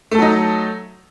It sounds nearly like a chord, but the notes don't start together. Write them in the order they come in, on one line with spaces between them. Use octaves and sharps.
A3 A4 F#3 D#4